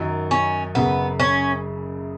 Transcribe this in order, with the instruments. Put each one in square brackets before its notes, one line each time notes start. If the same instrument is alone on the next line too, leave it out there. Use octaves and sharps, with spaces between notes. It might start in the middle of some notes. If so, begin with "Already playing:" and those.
Already playing: [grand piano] F#2 D#3 F#3 D#4
[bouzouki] C#4
[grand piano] F#1 F#2 C#3 [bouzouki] B3
[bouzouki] C#4